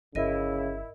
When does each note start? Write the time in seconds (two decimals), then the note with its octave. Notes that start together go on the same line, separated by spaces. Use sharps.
0.15 G1 C#3 E4 A#4 D#5 D#7